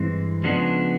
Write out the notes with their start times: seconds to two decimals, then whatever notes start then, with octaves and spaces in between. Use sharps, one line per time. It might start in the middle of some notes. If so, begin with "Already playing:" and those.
Already playing: G2 E3 G#3 C4
0.43 C#3 F3 G#3 B3 D4